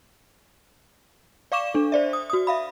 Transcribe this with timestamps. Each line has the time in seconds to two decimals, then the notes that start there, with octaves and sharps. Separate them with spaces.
1.52 D5 F5 C#6 D6 E7
1.74 D4 A4
1.92 C5 D5 E5
2.13 D#6
2.30 F#4 D#6
2.47 E5 F5 B5